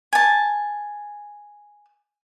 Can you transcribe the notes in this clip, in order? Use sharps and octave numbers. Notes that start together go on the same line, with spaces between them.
G#5 A5